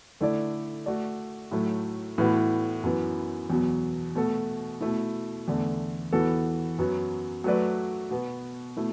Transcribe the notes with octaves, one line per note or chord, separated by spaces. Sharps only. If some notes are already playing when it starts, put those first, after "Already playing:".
D3 A3 E4 D5
A3 F#4 D5
A2 F#3 A3
A2 E3 B3 F#4 B4
F#2 E3 B3
E2 B2 F#3
B2 A3 F#4 A4
B2 A3 E4
E2 D3 A3
E2 E3 B3 F#4 A4
F#2 F#3 B3
F#3 A3 F#4 B4 D5
B2 B3 F#4
B2 A3 E4